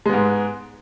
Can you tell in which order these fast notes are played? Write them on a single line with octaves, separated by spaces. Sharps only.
G#3 B3 G#2